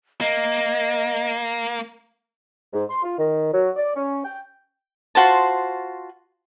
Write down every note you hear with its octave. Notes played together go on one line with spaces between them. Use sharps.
A#3 D#5
G#2
C6
F4
D#3
F#3
D5
C#4
G5
F4 F#4 C5 A5